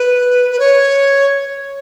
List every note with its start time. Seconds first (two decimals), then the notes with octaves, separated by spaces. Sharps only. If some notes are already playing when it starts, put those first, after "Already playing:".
Already playing: B4
0.51 B4
0.59 C#5